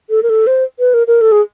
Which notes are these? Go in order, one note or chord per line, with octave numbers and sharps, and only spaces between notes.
A4
A#4
A4
C5
B4
A#4
A#4
A4
G#4